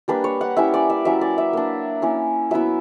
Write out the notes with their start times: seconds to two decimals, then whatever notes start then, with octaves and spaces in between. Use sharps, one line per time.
0.08 G3 A#3 D4 B4
0.24 C#5
0.41 F#5
0.57 G3 C#4 E4 E5
0.74 D5
0.90 E5
1.05 F#3 C#4 E4 E5
1.21 D5
1.38 E5
1.53 A#3 D4
2.02 A#3 C#4 E4
2.51 F#3 B3 E4 E5